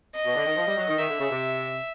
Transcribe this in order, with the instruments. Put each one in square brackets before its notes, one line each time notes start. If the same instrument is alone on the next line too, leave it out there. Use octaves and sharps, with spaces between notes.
[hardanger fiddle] D#5
[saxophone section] B2
D3
D#3
F3
G3
F#3
D#3
[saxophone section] D#3 [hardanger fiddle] E5
[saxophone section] D3
C#3
C3